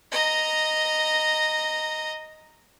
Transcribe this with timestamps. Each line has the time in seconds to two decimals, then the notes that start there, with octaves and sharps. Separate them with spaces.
0.11 D#5 A#5